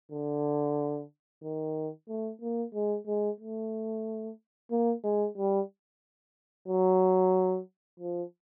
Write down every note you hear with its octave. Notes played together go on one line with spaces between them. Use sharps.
D3
D#3
A3
A#3
G#3
G#3
A3
A#3
G#3
G3
F#3
F3